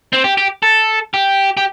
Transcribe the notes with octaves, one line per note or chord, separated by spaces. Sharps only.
C4
G4
G4
A4
G4
G4